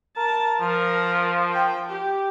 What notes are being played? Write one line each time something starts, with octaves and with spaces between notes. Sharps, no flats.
A#4 A5
F3 A#4
G5
G4